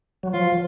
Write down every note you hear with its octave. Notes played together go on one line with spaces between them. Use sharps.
F#3
F3 F4